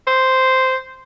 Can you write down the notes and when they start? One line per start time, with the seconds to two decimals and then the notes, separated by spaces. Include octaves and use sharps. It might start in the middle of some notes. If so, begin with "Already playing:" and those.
0.07 C5